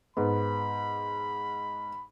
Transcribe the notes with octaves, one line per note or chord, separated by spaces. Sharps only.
G#2 B3 B5